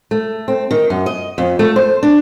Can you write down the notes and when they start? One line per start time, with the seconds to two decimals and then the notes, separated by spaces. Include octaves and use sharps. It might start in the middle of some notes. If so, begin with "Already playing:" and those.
0.11 A3
0.48 C4
0.71 D#3
0.90 F#2
1.06 D#5
1.38 F2
1.59 A3
1.76 C5
2.03 D4